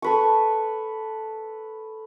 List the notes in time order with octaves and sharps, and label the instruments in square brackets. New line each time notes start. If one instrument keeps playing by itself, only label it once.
[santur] A4 B4 C#6